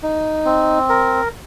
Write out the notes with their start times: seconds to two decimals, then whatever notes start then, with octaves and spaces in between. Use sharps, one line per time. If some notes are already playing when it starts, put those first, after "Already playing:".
0.03 D#4
0.45 C4
0.90 A#4